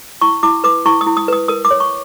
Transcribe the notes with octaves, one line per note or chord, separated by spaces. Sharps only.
E4 C#6
E4 D6
B4 D6
E4 C#6
D#6
E4
D#6
B4 D#6
A#4 D#6
D6
C#5
C#6